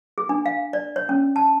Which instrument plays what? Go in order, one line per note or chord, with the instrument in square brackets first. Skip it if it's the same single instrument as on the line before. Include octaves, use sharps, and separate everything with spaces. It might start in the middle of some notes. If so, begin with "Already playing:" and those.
[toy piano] G#4
D4
F5
D5
C#5
C#4
A5